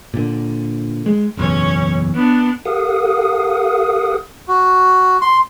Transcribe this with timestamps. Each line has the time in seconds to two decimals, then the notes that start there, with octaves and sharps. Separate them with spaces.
0.14 A#2 D3
1.06 G#3
1.37 F#1 B1 E2 C#4 C#5
2.14 B3 D4
2.65 G4 A4 A#4 F5 F#5 D#6
4.48 F#4
5.21 C6